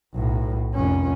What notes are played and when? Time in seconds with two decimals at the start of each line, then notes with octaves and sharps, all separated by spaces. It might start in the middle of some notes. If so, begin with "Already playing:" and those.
0.14 B1 A2
0.75 F1 C#4